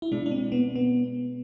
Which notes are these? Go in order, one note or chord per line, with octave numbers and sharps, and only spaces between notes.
E4
B2 G#3 D4
D4
C4
B3
B3